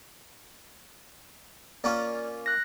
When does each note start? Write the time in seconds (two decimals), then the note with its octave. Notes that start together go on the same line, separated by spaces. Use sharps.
1.84 A#3 C#4 F4 D5
2.46 F#6 A#6